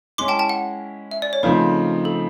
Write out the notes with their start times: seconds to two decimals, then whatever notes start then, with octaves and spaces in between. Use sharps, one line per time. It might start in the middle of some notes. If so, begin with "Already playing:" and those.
0.18 G#3 C#4 E4 C6 D6
0.28 G5 A5
0.39 G5 A5
0.49 F#5
1.11 E5
1.22 D5
1.33 C#5
1.43 C#3 F3 A3 C4 D#4 B4
2.05 A4